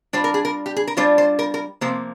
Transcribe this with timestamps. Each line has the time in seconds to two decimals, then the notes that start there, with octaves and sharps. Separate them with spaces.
0.13 G3 D4 F4 C5
0.24 A#4
0.34 G#4
0.45 A#4
0.66 G4
0.77 G#4
0.88 A#4
0.97 G3 D4 F4 C5
1.18 C5
1.39 A#4
1.54 A#4
1.81 C3 F3 A#3 C5